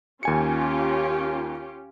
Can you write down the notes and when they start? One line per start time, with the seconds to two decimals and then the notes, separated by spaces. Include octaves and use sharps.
0.23 D#2 C#4 F4 G4 G#5 C#7